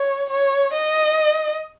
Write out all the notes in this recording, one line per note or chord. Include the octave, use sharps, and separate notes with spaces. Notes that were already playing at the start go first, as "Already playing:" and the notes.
Already playing: C#5
C#5
D#5